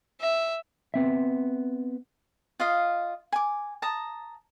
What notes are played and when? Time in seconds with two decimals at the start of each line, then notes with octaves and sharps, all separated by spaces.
0.21 E5
0.94 B3 C4 E5
2.60 F4 D#5 F5
3.32 G#5 D6
3.82 A5 A#5 D#6